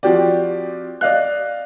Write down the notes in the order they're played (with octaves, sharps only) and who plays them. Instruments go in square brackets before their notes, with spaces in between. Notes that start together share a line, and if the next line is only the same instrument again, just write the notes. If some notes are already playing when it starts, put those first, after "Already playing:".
[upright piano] F3 C4 F#4 G4 D5
D5 D#5 F5 F#6